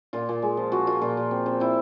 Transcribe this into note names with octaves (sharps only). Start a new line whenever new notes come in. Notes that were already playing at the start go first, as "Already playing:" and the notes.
A#2 F4
A#2
G#3
F3
F3 F#4
A#3 F4
A#2 F4
A#2
C4
C4
C4 E4